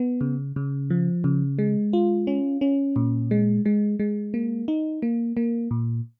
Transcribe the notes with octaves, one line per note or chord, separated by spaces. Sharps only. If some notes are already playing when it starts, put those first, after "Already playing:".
Already playing: B3
C#3
C#3
F3
C#3
G#3
F4
C#4
C#4
A#2
G#3
G#3
G#3
A#3
D#4
A#3
A#3
A#2